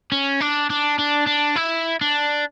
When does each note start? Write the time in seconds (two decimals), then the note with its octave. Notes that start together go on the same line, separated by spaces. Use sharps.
0.12 C#4
0.41 D4
0.70 D4
0.99 D4
1.27 D4
1.56 E4
2.01 D4